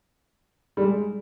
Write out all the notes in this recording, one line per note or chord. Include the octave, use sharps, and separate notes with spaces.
G3
G#3